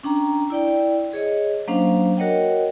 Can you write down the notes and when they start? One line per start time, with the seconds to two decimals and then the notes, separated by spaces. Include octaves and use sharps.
0.03 C#4 D4 G5 A#5
0.50 E4 D5 G5
1.13 G#4 C#5 D#5
1.67 F#3 A#3 C#4 D4 C5 F5
2.17 F#4 A#4 C#5 D#5 F#5 G5